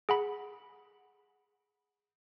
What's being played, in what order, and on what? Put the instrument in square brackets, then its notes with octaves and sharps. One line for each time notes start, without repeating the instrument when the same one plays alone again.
[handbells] G#4 F#5 B5